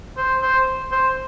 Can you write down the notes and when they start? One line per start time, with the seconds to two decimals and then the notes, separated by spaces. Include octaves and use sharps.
0.17 C5
0.42 C5
0.91 C5